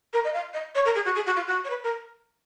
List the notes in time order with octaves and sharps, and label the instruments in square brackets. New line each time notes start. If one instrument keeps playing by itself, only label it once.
[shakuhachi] A#4
D#5
F5
D#5
C#5
A#4
G#4
F#4
G#4
F#4
F4
F#4
C#5
B4
A#4